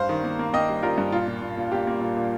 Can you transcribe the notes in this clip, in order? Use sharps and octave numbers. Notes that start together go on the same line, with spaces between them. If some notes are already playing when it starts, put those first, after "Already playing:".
Already playing: G2 C5 F5
D#3
A#3
A#3
A#3 D#5 G5
G3
G3 F4 A#4
G2
A#2 F4
A#2
A#2
A#2
A#3 G4
A#3
A#2
A#2